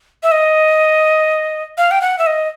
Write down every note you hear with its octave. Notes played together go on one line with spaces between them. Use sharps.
E5
D#5
F5
G5
F#5
E5
D#5